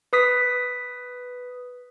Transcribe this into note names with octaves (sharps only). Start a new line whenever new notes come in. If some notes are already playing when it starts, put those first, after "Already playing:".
B4 D#6 B6